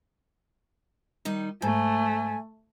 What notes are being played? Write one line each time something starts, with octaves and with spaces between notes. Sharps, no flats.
D#3 G3 D#4
G#2 A3 G#5